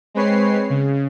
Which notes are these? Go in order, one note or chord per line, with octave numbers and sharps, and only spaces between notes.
G#3 C4 B4 C#5 C7
C#3